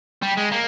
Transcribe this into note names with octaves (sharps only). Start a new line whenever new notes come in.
G3
G#3
A#3